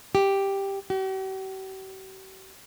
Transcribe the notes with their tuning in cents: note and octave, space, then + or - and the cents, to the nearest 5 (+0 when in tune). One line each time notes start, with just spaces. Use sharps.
G4 +5
G4 -45